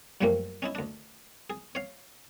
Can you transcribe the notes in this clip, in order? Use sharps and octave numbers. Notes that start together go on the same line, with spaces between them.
F#2 A#2 F3 G3 A3 A#3
C#4 D#4 E4
D2 D4
G#4
C#5 F5